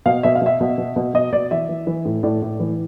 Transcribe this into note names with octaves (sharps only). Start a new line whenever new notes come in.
B2 F5
B2 E5
F5
B2 E5
B2
B2
B2
B2 D#5
B2 D5
E3 E5
E3
E3
A2
A2 D5
A2
E3